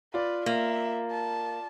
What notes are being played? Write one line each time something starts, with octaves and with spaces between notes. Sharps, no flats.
F4 B4 D5
A#3 E5
A5